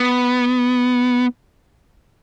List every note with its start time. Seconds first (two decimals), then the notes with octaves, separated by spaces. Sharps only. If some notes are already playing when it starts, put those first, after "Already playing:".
Already playing: B3